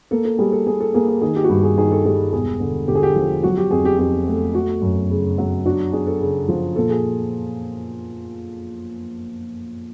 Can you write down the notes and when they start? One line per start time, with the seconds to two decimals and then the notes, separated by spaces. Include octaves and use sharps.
0.11 A#3 A4
0.25 A4
0.39 G3 G#4
0.52 A4
0.67 A#3 G#4
0.80 A4
0.94 A#3 G#4
1.08 G#4
1.21 D#3 G#4
1.36 G4
1.44 F#4
1.49 G2 G4
1.63 G#4
1.78 D#3 G#4
1.91 A4
2.05 G3 G#4
2.33 E1 G#4
2.60 D3
2.88 D3 G4
2.95 G#4
3.03 G4
3.16 F3
3.43 F#3 F#4
3.57 G4
3.71 F2 G#4
3.85 G4
3.99 F2 G4
4.27 A3
4.54 A3 F#4
4.82 F#2
5.10 C#3
5.38 F#3
5.66 D4 F#4
5.93 D4 G#4
6.07 A4
6.21 C#3
6.48 F3
6.76 A#2 A4
6.90 G#4